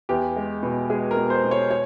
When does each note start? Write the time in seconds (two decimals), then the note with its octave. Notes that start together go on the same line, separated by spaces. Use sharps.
0.09 E2 G4
0.36 G#3
0.63 B2
0.90 G#3 G#4
1.11 A#4
1.17 B2
1.30 C5
1.45 B2
1.51 C#5
1.71 C#5